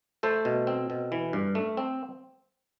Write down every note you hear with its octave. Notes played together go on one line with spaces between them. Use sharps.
A3 A4 C5
B2
C4
B2
E3
G2
A3
C4